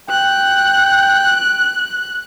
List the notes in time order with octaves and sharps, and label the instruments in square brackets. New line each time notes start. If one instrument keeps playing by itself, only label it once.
[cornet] G5 [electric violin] F#6